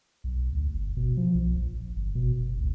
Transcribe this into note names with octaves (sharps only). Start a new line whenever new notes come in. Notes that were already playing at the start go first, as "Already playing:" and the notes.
B1
D2
G1
B2
F3
B1
A#1
G1
B2
F#1
C#2